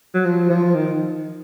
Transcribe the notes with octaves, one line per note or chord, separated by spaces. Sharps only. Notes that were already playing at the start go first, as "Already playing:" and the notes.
F#3
F3
F3
D#3